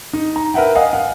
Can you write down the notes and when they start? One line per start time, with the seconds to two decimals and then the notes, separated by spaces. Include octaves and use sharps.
0.13 D#4
0.36 A#5
0.54 A#4 B4 E5 F#5 G5
0.75 D#5 F5 F#5 G#5
0.93 F5 F#5